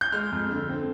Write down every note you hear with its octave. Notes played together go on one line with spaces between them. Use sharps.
G6
G#3 F6
F2
D3
C4